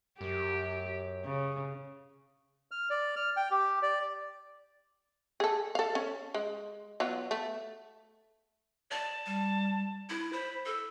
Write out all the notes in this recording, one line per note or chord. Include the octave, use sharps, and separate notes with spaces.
F#2 G4
C#3
F6
D5
F6
G5
G4
D5
G#4 A4
A4 F5
C#4
G#3
F#3 B3 F4
A3
D5 A5
G3
E4
C5 B5
A4 E6